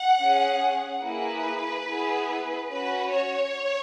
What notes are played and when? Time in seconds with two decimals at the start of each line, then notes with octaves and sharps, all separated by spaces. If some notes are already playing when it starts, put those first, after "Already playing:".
Already playing: F#5
0.19 C#4 G#4
1.02 A#3 E4 G#4 B4
1.87 B3 E4 G#4
2.70 C#4 F#4 B4
3.11 C#5